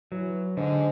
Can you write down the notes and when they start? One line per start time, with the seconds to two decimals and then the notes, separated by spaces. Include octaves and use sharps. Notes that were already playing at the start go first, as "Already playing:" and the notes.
0.12 E3 F#3
0.57 G#2 D3